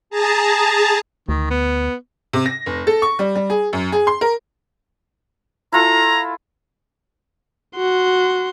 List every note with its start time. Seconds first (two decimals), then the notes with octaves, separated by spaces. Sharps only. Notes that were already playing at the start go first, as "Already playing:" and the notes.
0.10 G#4 A5 A#5
1.29 D2 D#3
1.51 B3
2.33 C3
2.46 A#6
2.66 F1
2.87 A4
3.02 C#6
3.19 G3
3.35 G3
3.50 G#4
3.73 F#2
3.92 G#4
4.07 C6
4.21 A#4
5.73 E4 F4 A4 A#5
7.76 F#4 C6